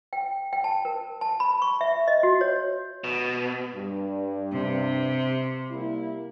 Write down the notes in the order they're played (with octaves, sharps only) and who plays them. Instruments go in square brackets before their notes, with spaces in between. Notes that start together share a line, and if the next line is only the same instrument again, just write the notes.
[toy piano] G5
G5
A5
A#4
A5
B5
C#6
E5
D#5
F#4
C#5
[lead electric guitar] B2
[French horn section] G2
[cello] C3
[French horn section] G3 A#3 E4